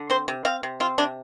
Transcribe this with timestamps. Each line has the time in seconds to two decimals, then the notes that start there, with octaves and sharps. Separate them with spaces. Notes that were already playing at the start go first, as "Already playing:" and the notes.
Already playing: D3
0.10 C4 C5
0.28 C3
0.45 C4 F5
0.63 C3
0.80 C4 F4
0.98 C3 D4